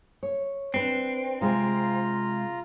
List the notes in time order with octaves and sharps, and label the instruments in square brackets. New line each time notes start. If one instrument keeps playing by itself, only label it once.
[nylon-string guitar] C#5
[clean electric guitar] C4 [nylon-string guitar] D4 B4
[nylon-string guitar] C3 G#3 [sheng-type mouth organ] F4 A#5